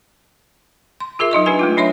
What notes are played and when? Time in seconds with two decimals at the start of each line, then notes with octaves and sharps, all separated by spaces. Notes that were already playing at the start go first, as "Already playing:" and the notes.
1.00 C6
1.19 F4 G#4 A#4 E5
1.31 F#3 D#4 D#5 C#6
1.46 D4 D#4 G4 B4 G#5
1.59 G#3 A3 F4
1.77 F#3 D4 C#5 E5 C6